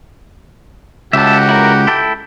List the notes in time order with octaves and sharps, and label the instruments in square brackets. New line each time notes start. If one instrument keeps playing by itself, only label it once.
[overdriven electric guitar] C#2 [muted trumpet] F#4 [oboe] G4 [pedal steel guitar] E5 A5
[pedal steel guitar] E4 A#4
E4 A4 G5